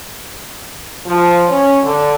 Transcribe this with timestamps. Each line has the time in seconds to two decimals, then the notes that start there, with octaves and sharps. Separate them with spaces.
1.06 F3
1.49 C#4
1.83 D3